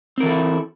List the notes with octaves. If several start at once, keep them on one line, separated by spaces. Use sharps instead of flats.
E3 C4 E4 A4 A#4